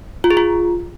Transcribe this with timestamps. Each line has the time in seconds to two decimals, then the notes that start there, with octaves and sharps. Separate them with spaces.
0.24 F4
0.31 G#4
0.37 F4